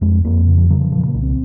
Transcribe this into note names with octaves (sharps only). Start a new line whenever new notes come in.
F2 G#3
F2 A#3
C#3
F3
C#3 F#3
F3
A#2 F3
A#3
C2
C4